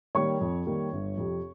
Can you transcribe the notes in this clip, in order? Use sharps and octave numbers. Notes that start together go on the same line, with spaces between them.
D#3 G3 A#3 C#5 C#6
F2
D#3 G3 A#3
G1
F2 C3